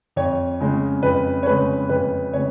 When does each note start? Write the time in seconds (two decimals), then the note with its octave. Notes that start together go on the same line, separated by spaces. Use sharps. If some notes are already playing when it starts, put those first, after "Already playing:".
0.16 F2 C#5
0.61 C#3 G#3 C#4
1.03 F2 B4
1.43 C#5
1.46 C#3 G#3 C#4 B4
1.89 F2 B4
2.33 C#3 G#3 C#5